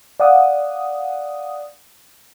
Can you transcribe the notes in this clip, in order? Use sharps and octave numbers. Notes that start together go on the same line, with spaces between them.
D5 F5 F#5 D#6